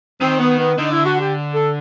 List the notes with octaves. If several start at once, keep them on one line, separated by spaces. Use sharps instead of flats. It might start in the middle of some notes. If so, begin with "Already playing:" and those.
D#3 C4
B3
B3
D3 D#4
E4
F#4
G4
A4